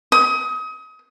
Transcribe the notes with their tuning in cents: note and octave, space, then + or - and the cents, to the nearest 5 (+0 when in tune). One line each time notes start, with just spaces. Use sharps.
D#6 +30